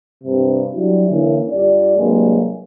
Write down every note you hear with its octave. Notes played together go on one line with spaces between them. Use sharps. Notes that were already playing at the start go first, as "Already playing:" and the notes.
G2 C3
F#3 G3 D4 E4 F#4
D3 E3 A#3 C#4 E4
G2 G3 F4 D5
C2 G2 F#3 G#3 A#3